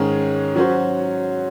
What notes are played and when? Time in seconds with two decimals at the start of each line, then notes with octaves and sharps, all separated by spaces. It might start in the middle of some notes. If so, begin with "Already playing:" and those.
Already playing: G#2 D#3 G#3 C#4 G#4
0.55 F#3 C#4 F#4 C5